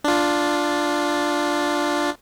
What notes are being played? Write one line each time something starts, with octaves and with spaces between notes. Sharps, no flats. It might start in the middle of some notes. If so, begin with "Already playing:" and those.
D4 F4